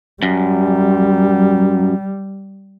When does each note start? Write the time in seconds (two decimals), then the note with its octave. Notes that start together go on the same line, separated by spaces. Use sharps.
0.23 F#2 G3